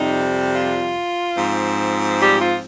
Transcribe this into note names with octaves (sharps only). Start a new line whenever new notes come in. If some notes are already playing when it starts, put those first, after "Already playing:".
Already playing: F2 C3 G3 D#4
F4
G#2 F3 C4
G3 G4
F4